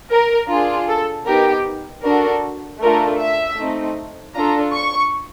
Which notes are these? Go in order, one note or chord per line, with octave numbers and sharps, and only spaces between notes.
A#4
D4 F4 G#4
A4
B3 D#4 G4 A#4
D4 F#4 A4 A#4
A3 D4 F4 A4 A#4
E5
A3 C4 D#4
D4 F4 A4 A#5
C#6